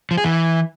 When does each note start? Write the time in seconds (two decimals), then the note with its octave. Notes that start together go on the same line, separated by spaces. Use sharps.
0.11 F3
0.18 G#4
0.24 E3